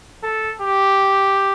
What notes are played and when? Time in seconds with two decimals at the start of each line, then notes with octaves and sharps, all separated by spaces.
0.23 A4
0.61 G4